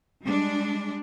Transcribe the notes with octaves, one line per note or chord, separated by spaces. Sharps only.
G3 G#3 D4